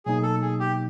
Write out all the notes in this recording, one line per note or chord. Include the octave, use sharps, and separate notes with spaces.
B2 F#3 A#3 D#4 G#4
A4
G#4
G4